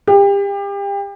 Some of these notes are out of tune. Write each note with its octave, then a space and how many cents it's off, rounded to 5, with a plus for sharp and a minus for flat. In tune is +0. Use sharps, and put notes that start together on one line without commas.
G4 +30